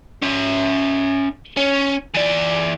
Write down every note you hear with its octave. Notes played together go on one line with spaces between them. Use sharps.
C#4 E5
C#4
E3 D5